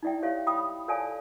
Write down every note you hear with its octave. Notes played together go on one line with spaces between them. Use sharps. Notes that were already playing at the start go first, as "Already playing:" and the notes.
D#4 E4 D5 E5 G5
G4 C#5 E5 F5
G5 B5 D#6
A4 C#5 D5 F5 G#5 A5